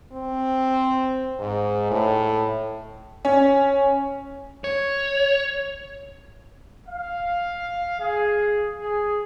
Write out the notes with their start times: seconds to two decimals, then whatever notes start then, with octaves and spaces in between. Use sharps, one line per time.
0.12 C4
1.39 G#2
1.91 A2
3.25 C#4
4.64 C#5
6.86 F5
8.00 G#4
8.80 G#4